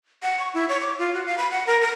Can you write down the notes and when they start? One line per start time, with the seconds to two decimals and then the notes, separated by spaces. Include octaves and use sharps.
0.23 F#5
0.39 C#6
0.54 E4
0.69 C#5
0.81 D6
0.99 F4
1.14 F#4
1.26 F5
1.38 B5
1.51 F#5
1.67 A#4
1.82 A#4